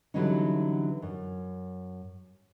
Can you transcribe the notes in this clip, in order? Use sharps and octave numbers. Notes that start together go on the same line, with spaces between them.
D3 E3 F#3 G3 C#4 D#4
F#2